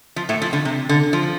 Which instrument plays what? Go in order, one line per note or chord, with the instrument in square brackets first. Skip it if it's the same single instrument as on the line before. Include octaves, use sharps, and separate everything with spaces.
[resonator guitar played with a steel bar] F3
A2 A3
F3
D3
C3
D3
F3